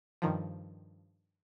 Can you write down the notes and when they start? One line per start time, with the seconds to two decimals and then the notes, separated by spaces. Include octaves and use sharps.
0.22 G2 D#3 F3